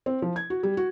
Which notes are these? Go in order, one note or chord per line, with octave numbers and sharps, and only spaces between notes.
C4
F3
G#6
F#4
G3
F#4